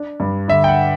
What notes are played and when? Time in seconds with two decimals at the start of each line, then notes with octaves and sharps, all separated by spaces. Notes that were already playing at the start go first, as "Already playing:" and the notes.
Already playing: D4
0.20 G2
0.48 D3 E5
0.64 G5
0.68 F#5